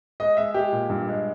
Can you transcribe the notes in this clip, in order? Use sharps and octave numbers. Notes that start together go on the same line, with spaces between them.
G#3 D#5
G#3 E5
G#3 G4
A#2
G2
G#3